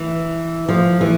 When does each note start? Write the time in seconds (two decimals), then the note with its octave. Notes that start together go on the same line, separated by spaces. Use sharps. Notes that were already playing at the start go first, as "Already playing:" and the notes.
Already playing: E3
0.69 F3
1.01 E3